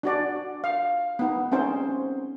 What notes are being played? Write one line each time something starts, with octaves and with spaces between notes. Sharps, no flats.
D4 F#4 D5
F5
B3 D#4
C4 C#4 D#4 C5